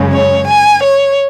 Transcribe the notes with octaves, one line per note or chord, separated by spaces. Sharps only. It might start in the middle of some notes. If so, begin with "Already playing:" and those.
Already playing: F#2 C#3 G#3 C#4
C#5
G#5
C#5